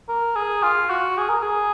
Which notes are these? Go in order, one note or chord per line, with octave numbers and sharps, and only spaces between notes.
A#4
G#4
F4
F#4
G#4
A#4
G#4